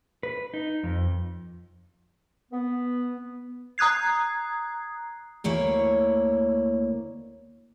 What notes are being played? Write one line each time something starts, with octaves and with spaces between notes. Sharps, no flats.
B4
D#4
F2
B3
A#5 D#6 F#6 G#6 C7
D2 A#3 E4 C#5